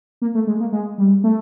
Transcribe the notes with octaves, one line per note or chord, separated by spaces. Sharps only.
A#3
A3
G#3
A#3
G#3
G3
A3